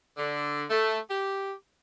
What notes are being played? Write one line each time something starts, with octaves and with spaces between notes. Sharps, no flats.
D3
A3
G4